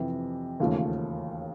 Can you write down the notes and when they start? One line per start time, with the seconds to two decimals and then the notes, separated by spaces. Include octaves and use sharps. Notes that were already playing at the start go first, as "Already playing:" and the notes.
Already playing: F2 C3 E3
0.60 E1 D#2 C#3 F3 A3